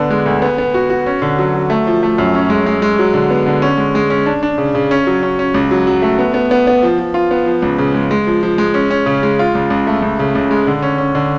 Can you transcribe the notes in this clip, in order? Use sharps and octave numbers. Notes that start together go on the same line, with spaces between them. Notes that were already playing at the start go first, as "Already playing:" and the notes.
Already playing: D3 B3 D4
G#3
D2
B3
B3
F#4
F#4
C#4
D3
F#3
F#3
A3
F3
A3
F#2
C#4
G#3
G#3
G#3
F#3
D3
B3
D3
C#4
G#3
G#3
C#4
D4
D4
C#3
C#3
C#4
F#3
C#4
C#4
C#2
F#3
F#3
A3
B3
B3
B3
B3
F3
F3
F4
B3
F3
C#2
C#3
G#3
G#3
F3
F3
G#3
C#4
C#4
C#3
G#3
F4
C#2
C#2
A3
C#2
C#3
C#2
G#3
D3
C#4
C#4
D3